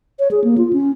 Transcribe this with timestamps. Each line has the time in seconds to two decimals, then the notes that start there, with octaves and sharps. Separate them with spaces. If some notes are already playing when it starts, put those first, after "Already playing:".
0.19 C#5
0.31 G#4
0.44 A#3
0.58 F4
0.73 C#4